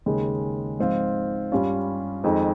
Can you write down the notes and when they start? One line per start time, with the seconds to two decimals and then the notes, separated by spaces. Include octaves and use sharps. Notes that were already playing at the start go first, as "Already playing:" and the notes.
0.06 D#2 C#3 G#3
0.79 G#2 F3 C4 F4
1.52 G2 G3 C#4 F4
2.24 F2 D#3 G#3 C4 D#4